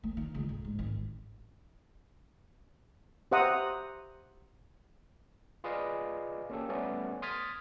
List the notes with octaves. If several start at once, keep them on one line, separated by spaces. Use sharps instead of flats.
A3
D#3
C#2
A2
G#2
G#1
G4 C5 E5 F#5 A#5 D#6
F4 G#4 B4 D5 D#5 F5
A#3 C#4 G4 A4
G3 A3 B3 C#4 D5
C6 D#6 F6 G#6 A6 B6